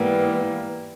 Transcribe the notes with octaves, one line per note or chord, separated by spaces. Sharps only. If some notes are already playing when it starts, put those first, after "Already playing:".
Already playing: G#2 E3 G3 A#3 B3